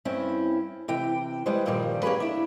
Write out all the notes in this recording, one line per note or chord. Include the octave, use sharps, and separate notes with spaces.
G2 C4 C#4 E4
C3 E3 G5
E3 G3 G#3 B4 C5
G2 A#2 D3 D#3 F3 G3
A#3 C#4 G4 G#4 B4
D4 E4